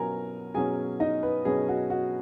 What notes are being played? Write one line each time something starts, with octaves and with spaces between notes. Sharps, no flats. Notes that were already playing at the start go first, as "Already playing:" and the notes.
Already playing: B2 F#3 C#4 A#4 G#5 A#5
B2 F#3 C#4 G#4 G#5
D#4 D#5
B3 B4
B2 F#3 C#4 G#4
F#4
F#4